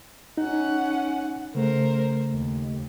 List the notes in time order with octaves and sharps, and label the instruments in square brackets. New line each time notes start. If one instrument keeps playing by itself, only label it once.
[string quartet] C#4 F#5 [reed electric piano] D#4
[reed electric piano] C#3 A3 [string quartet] A#4 C5
[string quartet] D#2